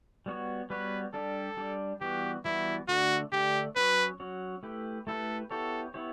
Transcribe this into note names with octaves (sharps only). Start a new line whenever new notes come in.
G3 B3 F#4 C#5
G3 B3 F#4 B4 C#5
G3 D4 G4 A4
G3 D4 G4
E3 G3 B3 F#4 G4
E3 G3 B3 E4 F#4
D3 A3 D4 F#4
D3 A3 D4 G4
F#3 C#4 F#4 B4 C#5
F#3 C#4 F#4 C#5
A3 E4 G4 B4
A3 E4 G4 A4 B4
B3 E4 G4 A4 C#5
B3 E4 G4 C#5